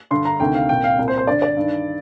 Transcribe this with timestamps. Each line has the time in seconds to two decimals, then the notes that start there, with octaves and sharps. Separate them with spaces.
0.11 G2 D3 C6
0.25 A#5
0.40 D2 C3 D#3 G5
0.55 F5
0.69 C2 A#2 G5
0.84 F5
0.98 C2 A#2
1.08 C5
1.18 C5
1.27 G2 D3 D5
1.42 D5
1.56 G2 D#3